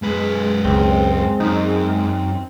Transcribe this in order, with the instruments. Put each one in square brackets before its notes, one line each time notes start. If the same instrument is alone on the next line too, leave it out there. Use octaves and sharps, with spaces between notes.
[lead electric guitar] F#2 B4 [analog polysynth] G#3
[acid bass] C#2 [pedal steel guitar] C4
[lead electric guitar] F#2 [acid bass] D#4